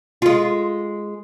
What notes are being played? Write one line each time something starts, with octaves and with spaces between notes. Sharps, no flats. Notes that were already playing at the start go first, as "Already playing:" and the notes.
G#3 F4